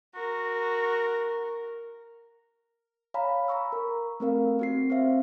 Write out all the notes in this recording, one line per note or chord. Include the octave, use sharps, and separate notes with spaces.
F#4 A#4
C#5 F5 G5 G#5 A#5 B5
A#5 B5 C#6 E6
A#4
A3 C4 A#4 F5
C4 F#4 C7
C4 F#4 C5 E5 F5